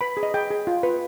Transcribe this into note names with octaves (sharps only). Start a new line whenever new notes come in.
B4 B5
G#4
D#5
G#4 G5
G#4
F4
B4